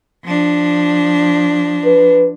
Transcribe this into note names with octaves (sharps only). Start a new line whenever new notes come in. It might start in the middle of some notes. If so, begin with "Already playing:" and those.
F3 D4
B4